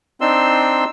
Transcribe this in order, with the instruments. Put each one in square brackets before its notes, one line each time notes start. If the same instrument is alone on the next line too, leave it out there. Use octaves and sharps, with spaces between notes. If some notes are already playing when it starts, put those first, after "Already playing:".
[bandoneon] C4 D4 D#4 C6 E6